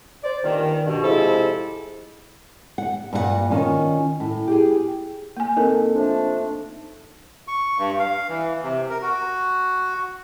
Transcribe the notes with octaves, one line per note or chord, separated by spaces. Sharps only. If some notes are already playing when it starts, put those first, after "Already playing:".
C5 D5
G2 A#2 D#3
G2 B2
C3 F3 G#3 E4 A4
F#5
G2 A#2 G4 F#5
D#3 C#4 F4
A2
G4 G#4
A#3 G#5
A#3 C4 D#4 A4 A#4
F3 A3 D4
C#6
G2
F5
E3
C3
A#4
F#4